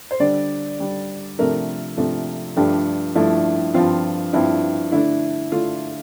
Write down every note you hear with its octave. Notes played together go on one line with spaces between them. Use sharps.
C5
D3 G3 D4 D5
D3 G3 D4
C3 F3 A3 D4 A#4
C3 F3 A3 D4
G2 F3 A3 D4 G4
G2 F3 A3 D4 E4
G2 F3 C4 F4
G2 F3 C4 E4
D3 A3 D4 E4
D3 A3 D4 F4